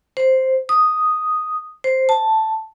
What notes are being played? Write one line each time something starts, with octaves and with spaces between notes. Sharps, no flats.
C5
D#6
C5
A5